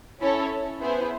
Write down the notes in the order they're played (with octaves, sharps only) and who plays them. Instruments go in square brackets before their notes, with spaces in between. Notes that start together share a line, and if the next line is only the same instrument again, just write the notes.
[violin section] C#4 E4 A4 C#5
B3 E4 G#4 C5